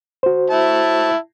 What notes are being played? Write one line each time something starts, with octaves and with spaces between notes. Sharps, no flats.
F#4 C5
E4 A5